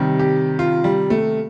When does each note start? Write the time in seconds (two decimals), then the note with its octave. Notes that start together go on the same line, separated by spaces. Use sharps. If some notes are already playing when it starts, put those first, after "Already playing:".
Already playing: C3 D#3 G3
0.19 G4
0.59 F4
0.84 G3
1.10 A3